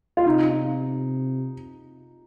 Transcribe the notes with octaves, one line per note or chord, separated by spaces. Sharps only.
F4
C3 D#4